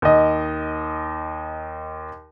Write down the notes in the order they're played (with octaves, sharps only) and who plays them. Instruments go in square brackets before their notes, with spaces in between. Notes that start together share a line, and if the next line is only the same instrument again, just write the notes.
[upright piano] D#2 D#5